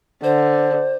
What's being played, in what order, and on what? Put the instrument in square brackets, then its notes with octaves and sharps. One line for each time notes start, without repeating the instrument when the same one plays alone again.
[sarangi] D3 [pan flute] C5